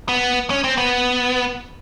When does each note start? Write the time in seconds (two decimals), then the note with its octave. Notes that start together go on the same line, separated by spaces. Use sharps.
0.09 B3
0.50 C#4
0.64 C4
0.77 B3